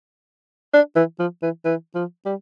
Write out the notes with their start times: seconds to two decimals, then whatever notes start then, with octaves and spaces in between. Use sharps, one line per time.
0.74 D4
0.96 E3
1.20 F3
1.42 E3
1.65 E3
1.95 F3
2.25 G3